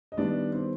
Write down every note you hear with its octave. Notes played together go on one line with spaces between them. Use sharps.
D#5
D#3 G3 B3 D4 D5
C4 C5